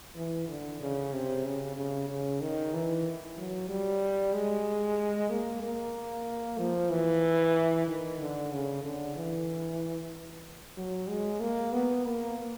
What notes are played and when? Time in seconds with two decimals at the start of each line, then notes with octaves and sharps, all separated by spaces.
0.16 E3
0.48 D3
0.81 C#3
1.13 C3
1.45 C#3
1.76 C#3
2.09 C#3
2.41 D#3
2.74 E3
3.38 F#3
3.69 G3
4.33 G#3
5.30 A#3
5.62 A#3
6.58 F3
6.91 E3
7.87 D#3
8.20 D3
8.52 C#3
8.84 D3
9.16 E3
10.77 F#3
11.09 G#3
11.40 A#3
11.73 B3
12.06 A#3